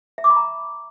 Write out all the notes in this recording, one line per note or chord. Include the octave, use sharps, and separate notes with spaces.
E5
D6
B5
A#5